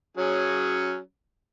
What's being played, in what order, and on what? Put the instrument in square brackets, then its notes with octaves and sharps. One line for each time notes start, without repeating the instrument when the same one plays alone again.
[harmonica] F#3 C#4 G#4